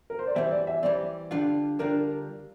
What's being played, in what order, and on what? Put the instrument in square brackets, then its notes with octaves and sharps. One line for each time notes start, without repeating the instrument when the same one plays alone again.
[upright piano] A#4
C5
D5
[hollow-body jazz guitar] E3 G3 C4 [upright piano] E5
[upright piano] D5
E5
[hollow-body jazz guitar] E3 G3 C4 [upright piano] D5
[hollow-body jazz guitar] D3 G3 D4 F4
[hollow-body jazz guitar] D3 G3 D4 F4 [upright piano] A#4